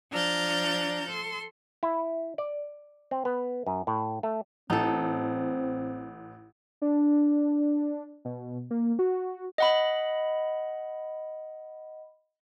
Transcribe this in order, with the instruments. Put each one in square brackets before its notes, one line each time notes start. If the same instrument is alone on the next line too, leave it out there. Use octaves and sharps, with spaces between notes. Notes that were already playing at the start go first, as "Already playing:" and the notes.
[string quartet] F3 D4 A#5 F6 G6 A6
A4 C6
[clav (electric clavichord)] E4
D5
C4
B3
F#2
A2
A3
[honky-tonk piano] A1 [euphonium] C4 [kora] D#4 A4
[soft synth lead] D4
B2
A#3
F#4
[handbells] D#5 F#5 B5